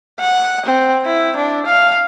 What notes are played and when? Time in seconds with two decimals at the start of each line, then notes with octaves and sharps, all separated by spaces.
0.20 F#5
0.66 C4
1.05 E4
1.36 D4
1.66 F5